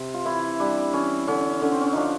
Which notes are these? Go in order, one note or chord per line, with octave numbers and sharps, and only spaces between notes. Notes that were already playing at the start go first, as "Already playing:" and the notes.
Already playing: C3
F4
E3 E4
G3 D4
E3 C#4
D3 C#4
D3 C#4
C4
C#4
F3 D4 D#4